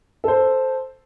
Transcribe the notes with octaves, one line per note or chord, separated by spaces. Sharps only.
A4 C5